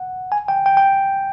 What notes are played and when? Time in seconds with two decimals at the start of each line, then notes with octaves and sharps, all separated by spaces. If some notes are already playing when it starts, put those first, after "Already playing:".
Already playing: F#5
0.32 G#5
0.48 G5
0.66 G5
0.77 G5